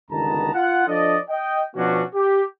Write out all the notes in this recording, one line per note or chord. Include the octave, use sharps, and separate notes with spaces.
G1 C#2 D#3 B3 A5 A#5
F4 F#5
F3 D4 A4 D5 D#5
D#5 G5
B2 F3 B3 C#4 D4 F#4
G4